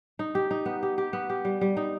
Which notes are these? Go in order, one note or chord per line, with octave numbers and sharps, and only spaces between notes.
D#4
G4
D#4
B3
G4
G4
B3
G4
G3
G3
D#4